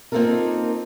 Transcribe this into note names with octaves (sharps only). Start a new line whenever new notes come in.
A#3 C4 D#4 F4 A4 A#4